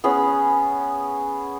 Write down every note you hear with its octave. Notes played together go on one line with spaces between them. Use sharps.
B3 C#4 G#4